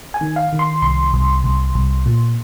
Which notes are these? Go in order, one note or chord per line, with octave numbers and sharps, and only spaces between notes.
G#5
D#3
F5
D#3
C6
C2 C6
C2
C2
C2
A#2